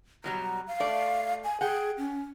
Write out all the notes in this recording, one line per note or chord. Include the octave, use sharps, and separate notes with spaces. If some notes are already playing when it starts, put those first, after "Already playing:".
B2 F#3 G3 A#5
F5
A3 D5
G#5
G#4 F#5 G5
C#4